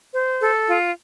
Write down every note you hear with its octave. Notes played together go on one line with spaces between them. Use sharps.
C5
A4
F4